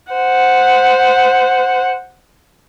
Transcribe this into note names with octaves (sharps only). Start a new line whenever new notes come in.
C5 F#5